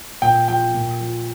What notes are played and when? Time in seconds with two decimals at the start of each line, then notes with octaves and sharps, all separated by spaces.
0.22 A#2 G5
0.48 F3 G5
0.74 A#2
1.01 F3